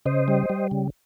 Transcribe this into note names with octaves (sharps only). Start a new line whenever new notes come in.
C#3 C5 D#5
G3
G3
C#3